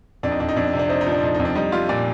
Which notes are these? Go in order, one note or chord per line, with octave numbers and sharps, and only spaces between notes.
F2 D4
D#4
F2 D4
D#4
F2 D4
C3
D4
C4 D#4
D#4
F3
D4
F2 D#4
D#4
F2
D4
G3 D#4
G3 F4
A#2 D5